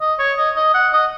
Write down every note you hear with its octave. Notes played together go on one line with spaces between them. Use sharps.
D#5
C#5
D#5
D#5
F#5
D#5